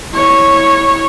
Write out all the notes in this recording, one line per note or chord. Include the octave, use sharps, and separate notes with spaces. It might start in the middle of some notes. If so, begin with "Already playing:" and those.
E4 C#5